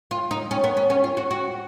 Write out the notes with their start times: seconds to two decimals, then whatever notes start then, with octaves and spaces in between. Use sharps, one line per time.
0.11 F4
0.31 D#4
0.51 C#4
0.64 B3
0.77 C#4
0.90 C#4
1.04 F4
1.17 F#4
1.31 F#4